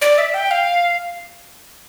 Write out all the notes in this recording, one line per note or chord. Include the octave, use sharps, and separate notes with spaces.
D5
E5
G5
F5